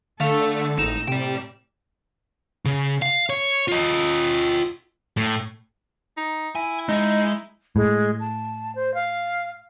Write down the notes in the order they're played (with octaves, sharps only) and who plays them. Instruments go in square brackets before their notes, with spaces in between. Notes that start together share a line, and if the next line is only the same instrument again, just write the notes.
[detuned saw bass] D3 [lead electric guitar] A3 [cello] A4 [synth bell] F5
[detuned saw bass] G#1 [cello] A2 [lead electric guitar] D#4 [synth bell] E7
[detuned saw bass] C3 [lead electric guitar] D5 G5
[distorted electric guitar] C#3
F5
C#5
F4 D#5
A2
[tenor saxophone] D#4
[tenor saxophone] E4 [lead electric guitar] G#5
[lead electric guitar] G#3 [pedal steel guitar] D#4
[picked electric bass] A2 [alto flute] G#3
[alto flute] A5
C5
F5